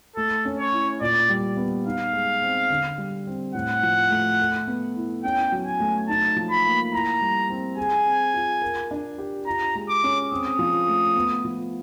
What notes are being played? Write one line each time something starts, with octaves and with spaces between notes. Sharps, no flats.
A3 A4
C#4
C#5
E4
A#2 D5
G3
B3
D#4 F5
G#3
C4
D3
G3
C4
A2 F#5
F3
A3
A4
B3
E4
C#4 G5
F#3
G#5
A3
D#4 A5
F3
B5
A#3
E4 A#5
G3
C4
G#4 G#5
C4
F4
A#4
D4
G4
F4 A#5
G#3
D6
C#4
C4 D#6
F3
A3
B3
F3